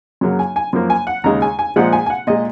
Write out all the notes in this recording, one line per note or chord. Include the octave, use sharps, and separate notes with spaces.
F#2 C#3 F#3 A#3
G#5
G#5
F#2 F3 A#3
G#5
F#5
D#2 C#3 G#3 A#5
G#5
G#5
A#2 F3 G#3 F#5
G#5
G#5
F#5
A#2 G#3 D#5